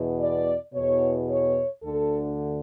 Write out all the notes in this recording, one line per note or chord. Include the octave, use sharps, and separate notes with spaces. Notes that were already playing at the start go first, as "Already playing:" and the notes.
Already playing: E2 B2
D5
E2 B2 C#5
C#5
D2 D3 A4